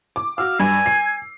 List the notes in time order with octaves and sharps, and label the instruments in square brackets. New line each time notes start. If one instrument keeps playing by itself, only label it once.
[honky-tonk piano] D6
[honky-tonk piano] F#4 E6 [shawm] F5
[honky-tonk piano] G2 [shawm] G#5
[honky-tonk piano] C7